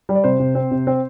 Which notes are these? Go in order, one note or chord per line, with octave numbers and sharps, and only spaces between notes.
G3
D5
C3 C5
C3
C4
C3
C4